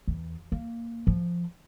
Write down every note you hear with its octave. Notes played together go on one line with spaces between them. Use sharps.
E2
A#3
F3